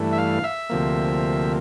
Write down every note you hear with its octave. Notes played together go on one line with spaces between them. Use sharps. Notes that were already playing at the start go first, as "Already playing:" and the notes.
Already playing: G2 E3 A3
E5
F5
E5
D2 C3 F3 A#3